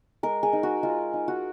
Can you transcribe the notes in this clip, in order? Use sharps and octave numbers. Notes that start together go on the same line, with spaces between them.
G#3 A#4
G#4
D#4
F#4
G#3 F4
D#4
F#4